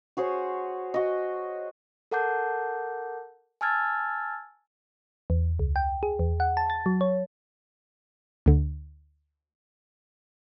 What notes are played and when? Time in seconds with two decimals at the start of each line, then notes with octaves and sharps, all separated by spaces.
0.17 F#4 G#4 C5 C#5
0.94 F#4 D#5
2.11 A4 A#4 F#5 A5 D6 G6
3.61 G#5 A5 E6 F6 G#6 A6
5.30 E2
5.59 C#2
5.76 G5
6.03 G#4
6.19 E2
6.40 F#5
6.57 A5
6.70 A6
6.86 F#3
7.01 C#5
8.46 D2 D3